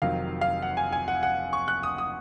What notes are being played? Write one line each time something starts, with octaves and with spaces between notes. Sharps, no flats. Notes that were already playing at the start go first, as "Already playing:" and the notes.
F1 F2 D#3 F#3 F5
F5
F#5
G#5
G#5
F#5
F#5
C#6
F#6
D#6
D#6